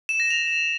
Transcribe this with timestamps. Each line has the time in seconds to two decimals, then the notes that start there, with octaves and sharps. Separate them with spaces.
0.09 E7
0.20 A#6
0.30 F7